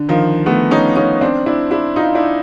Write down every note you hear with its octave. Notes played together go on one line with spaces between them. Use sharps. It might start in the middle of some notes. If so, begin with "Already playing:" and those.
Already playing: D3
D#3 F3
A3 B3
C#4 D#4
C#4 D#4
C4 D4
D4 E4
D4 E4
D#4 F4
D4 E4